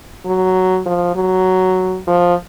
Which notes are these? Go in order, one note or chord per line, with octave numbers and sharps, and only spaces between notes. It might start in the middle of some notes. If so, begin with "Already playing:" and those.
F#3
F3
F#3
F3